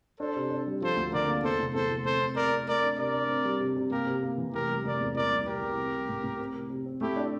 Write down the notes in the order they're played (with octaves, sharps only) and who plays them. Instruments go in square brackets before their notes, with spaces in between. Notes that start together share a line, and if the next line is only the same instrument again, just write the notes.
[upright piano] D4 [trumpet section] A4 C5
[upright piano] C3
D4
G3
[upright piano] F3 [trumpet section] A4 C5
[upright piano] D2
[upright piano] D3 [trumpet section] A#4 D5
[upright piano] A#3
[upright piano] E2 [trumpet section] A4 C5
[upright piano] F1
[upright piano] E2 [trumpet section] A4 C5
[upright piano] F1
[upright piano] C4 [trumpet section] A4 C5
[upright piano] C4
[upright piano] C3 [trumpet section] A#4 D5
[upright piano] C4
[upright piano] A3 [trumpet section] A#4 D5
[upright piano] D4
[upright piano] C3 [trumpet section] A#4 D5
[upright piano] D4
C4
G3
C3
C3
[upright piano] A#3 [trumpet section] G4 A#4
[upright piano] C3
A#3
E3
[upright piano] F1 [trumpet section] G4 A#4
[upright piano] G3
[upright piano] F1 [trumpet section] A#4 D5
[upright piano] E2
[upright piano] A#2 [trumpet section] A#4 D5
[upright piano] C2
[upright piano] C2 [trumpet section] G4 A#4
[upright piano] C2
C4
G3
A2
A2
C4
C3
C3
C4
[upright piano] A3 [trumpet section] E4 G4
[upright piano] D4